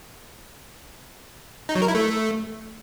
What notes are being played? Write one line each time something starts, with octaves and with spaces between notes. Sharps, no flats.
D#4
F#3
A#4
E4
A3